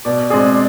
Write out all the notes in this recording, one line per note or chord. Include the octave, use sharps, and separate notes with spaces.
B2 D5
G#3 C4 G#4 D5